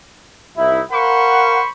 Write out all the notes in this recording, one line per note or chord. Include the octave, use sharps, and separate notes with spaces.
C2 D#4 E4
A#4 C5 F5 F#5 B5 C#6